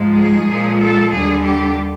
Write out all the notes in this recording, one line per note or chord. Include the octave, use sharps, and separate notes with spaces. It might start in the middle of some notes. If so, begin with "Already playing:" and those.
Already playing: G#2 F3 G#3
G#4
A#2 F3 G#3
A4
D#2 D3 G3 G#4
G4